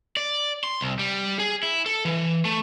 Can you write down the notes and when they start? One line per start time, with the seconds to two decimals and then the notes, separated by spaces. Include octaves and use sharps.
0.17 D5
0.64 C6
0.81 C2
0.99 G3
1.40 G#4
1.63 E4
1.86 A4
2.05 E3
2.45 A3